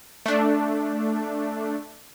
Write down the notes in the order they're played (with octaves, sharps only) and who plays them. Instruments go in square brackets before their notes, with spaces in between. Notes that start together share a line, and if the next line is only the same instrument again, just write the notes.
[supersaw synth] A3 D4